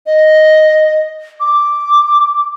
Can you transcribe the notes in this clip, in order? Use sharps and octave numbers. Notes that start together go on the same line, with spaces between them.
D#5
D6